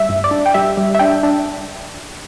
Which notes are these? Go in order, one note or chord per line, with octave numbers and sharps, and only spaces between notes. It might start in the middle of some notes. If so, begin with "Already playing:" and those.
Already playing: G3 E5
G2
D5
D4
G5
G3 E5
G3
E5
D4 G5
D4